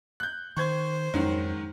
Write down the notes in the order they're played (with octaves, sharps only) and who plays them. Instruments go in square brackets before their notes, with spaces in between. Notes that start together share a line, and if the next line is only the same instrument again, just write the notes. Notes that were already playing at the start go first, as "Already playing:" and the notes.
[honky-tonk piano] F#6 G6
[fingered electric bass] D#3 [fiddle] C5 [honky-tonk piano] C#6 G6 G#6
[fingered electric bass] F2 C#4 [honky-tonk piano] G#2 D#3 F#3